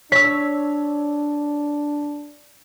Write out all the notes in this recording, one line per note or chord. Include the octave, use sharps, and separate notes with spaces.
D4 C#5 E6 B6